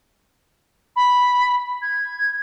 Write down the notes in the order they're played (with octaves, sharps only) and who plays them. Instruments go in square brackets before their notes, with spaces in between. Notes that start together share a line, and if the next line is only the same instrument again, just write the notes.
[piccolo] B5
G#6